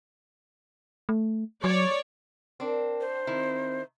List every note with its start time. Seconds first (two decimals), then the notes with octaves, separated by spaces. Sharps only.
1.09 A3
1.64 F#3 C#5 D5
2.60 C4 D4 A#4
3.01 C5
3.27 D#3 C4 E4